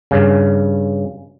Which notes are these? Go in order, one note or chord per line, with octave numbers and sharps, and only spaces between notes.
G2 C#3